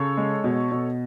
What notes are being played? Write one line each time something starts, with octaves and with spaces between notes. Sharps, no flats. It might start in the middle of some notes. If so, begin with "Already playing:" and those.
Already playing: C#3 A4 C#5
G#3
B2
B2